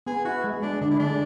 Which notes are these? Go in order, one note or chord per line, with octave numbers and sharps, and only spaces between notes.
B3 G#4
E4 F#4
G#3
G#3 D4
D3 D4
E4
G#3 D4